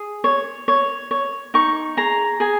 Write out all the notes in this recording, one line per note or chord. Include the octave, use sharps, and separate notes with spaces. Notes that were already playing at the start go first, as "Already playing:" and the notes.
Already playing: G#4
C#5
C#5
C#5
D#4 C#6
G#4 A#5
G#4 G#5